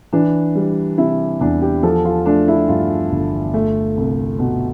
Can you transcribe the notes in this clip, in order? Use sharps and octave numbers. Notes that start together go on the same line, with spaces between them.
E3 D4
G3
C3 E4
E2 D4
G4
F3 A4
F4
A3 D4
E4
G2 F4
G1
A3
C2
B2